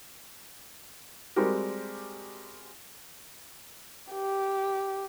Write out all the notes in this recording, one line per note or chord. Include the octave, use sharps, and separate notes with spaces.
G3 G#3 C4 F#4 G4 A#4
G4